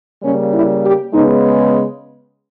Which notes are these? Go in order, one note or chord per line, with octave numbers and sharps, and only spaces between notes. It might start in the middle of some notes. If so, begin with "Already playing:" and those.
C#3 G3 A#3 C#4
E4
G4
C#3 G#3 B3 D#4